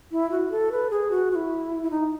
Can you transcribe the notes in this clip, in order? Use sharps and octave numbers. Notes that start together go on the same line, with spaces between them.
E4
F#4
A4
B4
G#4
F#4
F#4
E4
E4
D#4